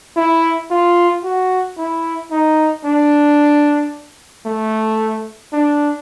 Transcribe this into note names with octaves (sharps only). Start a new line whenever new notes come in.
E4
F4
F#4
E4
D#4
D4
A3
D4